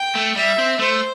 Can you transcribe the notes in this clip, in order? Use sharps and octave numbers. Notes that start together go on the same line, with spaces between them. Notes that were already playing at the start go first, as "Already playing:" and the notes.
Already playing: G5
A3
G3 E5
C4
A3 C5